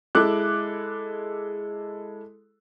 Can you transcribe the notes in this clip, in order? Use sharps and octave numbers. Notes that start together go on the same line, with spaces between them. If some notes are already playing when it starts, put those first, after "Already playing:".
G#3 E4 A4 D6 F#6